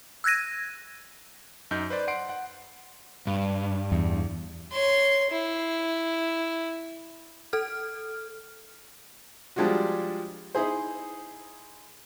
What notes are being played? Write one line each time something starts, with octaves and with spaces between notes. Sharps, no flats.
E6 F#6 G#6 A#6 D#7
F#2 D#4 G6
B4 C5 D5
F#5 C6 C7 D7
F#5
G2
E2
C#5 C6
E4
A4 F6
F3 G3 G#3 D4 F4 F#4
D#4 E4 G#4 C5